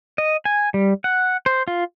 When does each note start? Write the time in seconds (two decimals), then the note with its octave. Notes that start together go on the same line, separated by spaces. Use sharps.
0.18 D#5
0.45 G#5
0.74 G3
1.04 F#5
1.46 C5
1.68 F4